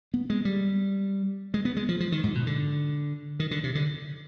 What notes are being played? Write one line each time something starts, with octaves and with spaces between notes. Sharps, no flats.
B3
G#3
G3
G#3
B3
G#3
F3
F3
D#3
G#2
B2
D3
D#3
D3
C3
D3